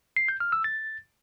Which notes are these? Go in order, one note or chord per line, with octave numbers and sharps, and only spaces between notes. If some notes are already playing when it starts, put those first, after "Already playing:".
C7
G6
F6
E6
A6